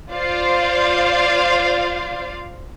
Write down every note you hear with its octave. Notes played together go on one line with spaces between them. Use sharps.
F4 C5 D5 F5